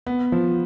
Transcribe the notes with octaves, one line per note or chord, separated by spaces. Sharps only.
B3
F3